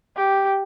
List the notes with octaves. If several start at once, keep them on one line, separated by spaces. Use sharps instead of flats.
G4